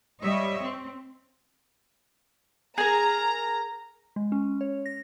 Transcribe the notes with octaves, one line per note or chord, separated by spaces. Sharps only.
G3 C#5 D#5 E5
C4
G#4 A#4 A#5
G#3
C#4
C#5
A#6